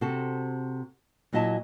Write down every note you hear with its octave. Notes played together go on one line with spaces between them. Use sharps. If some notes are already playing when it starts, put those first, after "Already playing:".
C3 C4 F#4 A4
A#2 F#3 E4 D#5 E5 A5